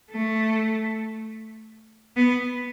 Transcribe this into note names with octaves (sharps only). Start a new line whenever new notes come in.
A3
B3